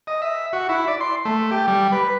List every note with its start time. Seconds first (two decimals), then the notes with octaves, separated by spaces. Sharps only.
0.07 D#5
0.22 E5
0.53 F#4
0.69 E4
0.88 D5
1.00 C6
1.25 A3
1.51 G4
1.68 G3
1.92 B4